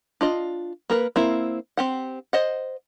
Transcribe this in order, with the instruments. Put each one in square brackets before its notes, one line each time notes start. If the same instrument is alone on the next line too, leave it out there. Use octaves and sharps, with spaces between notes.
[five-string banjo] D4 F4 D#5
A#3 A#4 B4
A#3 C4 E4
C4 G4 F#5
C5 D#5 F#5